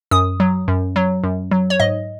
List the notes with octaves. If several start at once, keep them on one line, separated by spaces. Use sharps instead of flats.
F#2 D#6
F#3
F#2
F#3
F#2
F#3
C#5
G#2 D#5